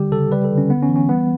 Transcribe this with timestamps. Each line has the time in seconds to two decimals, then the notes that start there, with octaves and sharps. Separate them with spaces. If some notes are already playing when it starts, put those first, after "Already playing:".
Already playing: D3 G3 G4
0.12 C#3 A4
0.32 G3 B4
0.44 A4
0.51 D3
0.58 C#4
0.70 B3
0.83 C#4
0.89 E3
0.96 C#4
1.09 G3 B3